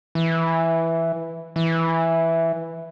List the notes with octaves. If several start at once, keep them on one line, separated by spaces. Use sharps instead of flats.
E3
E3